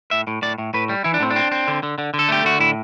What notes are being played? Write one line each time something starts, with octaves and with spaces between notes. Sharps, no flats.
A2 E5
A2
A2 D5
A2
A2 B4
G3
E3 E4
D4
A2 C4
D4
C4
C4
D3
D3
D3
D3
A4
A3 G4
D3 F#4
A2 E4